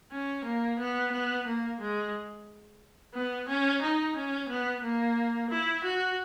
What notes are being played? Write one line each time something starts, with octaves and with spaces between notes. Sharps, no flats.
C#4
A#3
B3
B3
A#3
G#3
B3
C#4
D#4
C#4
B3
A#3
E4
F#4